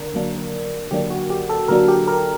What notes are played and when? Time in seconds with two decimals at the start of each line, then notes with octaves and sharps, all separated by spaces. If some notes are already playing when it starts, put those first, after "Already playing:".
Already playing: D3 D4 A#4
0.14 D3 F#3 A#3 D4
0.91 D3 F#3 A#3 D4 G4
1.10 F#4
1.30 G4
1.49 A4
1.68 D3 F#3 A#3 D4 A#4
1.88 G4
2.08 A#4